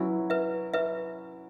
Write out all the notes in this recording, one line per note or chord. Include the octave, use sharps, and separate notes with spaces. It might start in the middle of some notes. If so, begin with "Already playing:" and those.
Already playing: F#3 C#4 E4 B4 E5
B4 E5
B4 E5